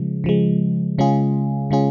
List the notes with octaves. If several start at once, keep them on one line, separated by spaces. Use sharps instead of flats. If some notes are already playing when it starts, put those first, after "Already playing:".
Already playing: C#3 F3 G#3
C#3 F3 G#3
C#3 G#3 C#4 F4 G#4
C#3 G#3 C#4 F4 G#4